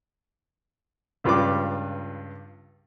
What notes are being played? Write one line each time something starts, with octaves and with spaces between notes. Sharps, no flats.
C#2 G2 F4 B4 B5 D6